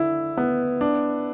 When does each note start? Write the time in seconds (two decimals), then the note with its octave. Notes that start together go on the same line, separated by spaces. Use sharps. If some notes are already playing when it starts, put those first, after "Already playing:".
Already playing: D3 E4
0.37 B3
0.81 D4